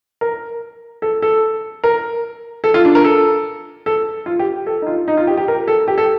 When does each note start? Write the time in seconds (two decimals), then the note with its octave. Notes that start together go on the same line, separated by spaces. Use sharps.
0.21 A#4
1.02 A4
1.22 A4
1.84 A#4
2.64 A4
2.74 F4
2.85 D4
2.95 A#4
3.04 A4
3.86 A4
4.26 F4
4.39 G4
4.67 A4
4.82 D#4
4.87 F4
5.08 D#4
5.17 F4
5.27 G4
5.37 G4
5.48 A#4
5.68 A4
5.88 G4
5.98 A4